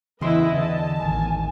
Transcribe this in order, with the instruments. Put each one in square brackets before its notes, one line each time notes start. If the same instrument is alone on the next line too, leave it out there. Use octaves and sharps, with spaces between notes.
[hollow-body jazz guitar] E2 C6 [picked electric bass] C#3 E3 [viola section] E4 B4 [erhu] D#5
[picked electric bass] D3 [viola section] A5
[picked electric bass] A1 D#3 [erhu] G#5